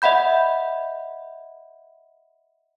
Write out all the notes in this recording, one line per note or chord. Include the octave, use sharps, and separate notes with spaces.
D#5 E5 F#5 B5 G6